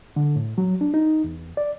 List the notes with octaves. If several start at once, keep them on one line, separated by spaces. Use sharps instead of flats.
D3
A2
F#3
D4
D#4
E2
D5